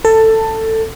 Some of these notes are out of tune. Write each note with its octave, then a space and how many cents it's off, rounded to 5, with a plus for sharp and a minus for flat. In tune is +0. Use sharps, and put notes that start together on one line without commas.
A4 +15